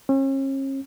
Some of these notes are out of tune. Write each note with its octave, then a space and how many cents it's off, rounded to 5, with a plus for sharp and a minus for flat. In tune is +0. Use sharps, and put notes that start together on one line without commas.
C#4 -40